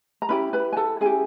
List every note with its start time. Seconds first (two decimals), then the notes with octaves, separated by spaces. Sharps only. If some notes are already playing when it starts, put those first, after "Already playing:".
0.22 A#5
0.29 C#4 E4 G4 B4 B5
0.53 B4 B5
0.73 G#5
0.77 A4 A5
1.01 C#4 E4 G4 G#4 G#5